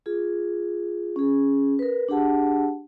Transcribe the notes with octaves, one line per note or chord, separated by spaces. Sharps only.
F4 G#4
C#4 G#4
A#4 B4
D4 G4 G#4 F#5 A5